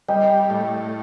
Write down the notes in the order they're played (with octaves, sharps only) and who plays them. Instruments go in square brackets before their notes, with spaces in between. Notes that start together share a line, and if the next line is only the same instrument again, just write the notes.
[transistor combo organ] G3 [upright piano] D#5 G5
[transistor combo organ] A2